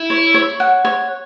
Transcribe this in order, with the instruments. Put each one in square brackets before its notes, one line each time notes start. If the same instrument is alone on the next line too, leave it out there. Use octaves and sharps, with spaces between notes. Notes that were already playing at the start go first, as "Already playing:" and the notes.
Already playing: [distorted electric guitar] E4
[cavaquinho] C#5
C#5
F#5
C#5